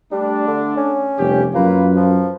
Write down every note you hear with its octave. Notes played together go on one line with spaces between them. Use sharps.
G3 A3 D4
D3
C#4
F1 G3 B3 G4
F#2 A#3 F4 B4
F3